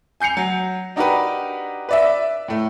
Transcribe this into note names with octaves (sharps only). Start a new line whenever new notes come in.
G#5 G6 C7 C#7 F7
F#3
D4 D#4 F#4 G4 A#4 B4
B4 D5 E5
A2 A3